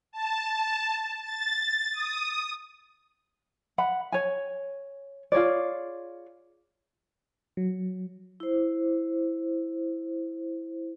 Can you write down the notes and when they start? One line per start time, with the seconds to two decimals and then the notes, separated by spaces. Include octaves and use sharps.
0.12 A5
1.21 A6
1.91 D#6
3.78 F#5 B5
4.12 C#5 G#5
5.32 F4 G#4 C#5 D5
7.57 F#3
8.40 E4 C5